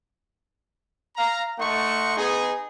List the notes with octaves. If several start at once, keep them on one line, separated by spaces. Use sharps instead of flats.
F5 A#5
A3 D#4 F#5 C6 C#6
B3 D#4 G#4